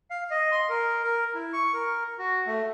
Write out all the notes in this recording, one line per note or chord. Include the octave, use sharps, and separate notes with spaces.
F5
D#5
C6
A#4
A#4
E4
C#6
A#4
F#4
A3